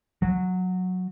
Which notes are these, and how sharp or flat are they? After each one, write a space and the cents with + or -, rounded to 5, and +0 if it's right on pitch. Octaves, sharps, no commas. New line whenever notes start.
F#3 -10